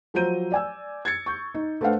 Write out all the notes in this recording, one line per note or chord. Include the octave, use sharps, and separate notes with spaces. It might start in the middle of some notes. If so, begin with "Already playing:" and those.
F3 F#3 C5 A#5 G6 D#7
D5 G#5 E6
G#6 A6 C#7
C#6 G6
D#4
A3 D4 B4 C5 F5 F#5